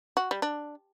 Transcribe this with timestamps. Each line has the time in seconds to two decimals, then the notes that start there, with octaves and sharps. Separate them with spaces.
0.17 F#4
0.31 G3
0.42 D4